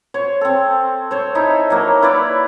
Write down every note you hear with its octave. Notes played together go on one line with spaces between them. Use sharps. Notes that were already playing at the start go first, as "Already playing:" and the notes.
C5 C#5
C4 A4
C5 C#5
D#4 E4 A4 E5
F#3 A#3
E4 B4 C#5 D5